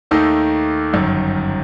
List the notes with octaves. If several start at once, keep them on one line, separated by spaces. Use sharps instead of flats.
D#2 D#3 A3 D#4 A4
G1 F#2 D#3